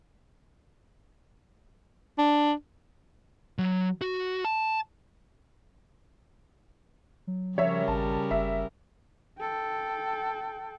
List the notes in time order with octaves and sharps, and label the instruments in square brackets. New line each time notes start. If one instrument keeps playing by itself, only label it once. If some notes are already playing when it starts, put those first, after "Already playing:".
[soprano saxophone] D4
[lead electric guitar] F#3
F#4
A5
[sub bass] F#3
[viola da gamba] C#3 G3 A#4 [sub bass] F3 [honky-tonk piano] C#5 E5
[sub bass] G#1 [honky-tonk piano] A5
[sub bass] F#1 [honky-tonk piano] E5
[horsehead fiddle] A4 G5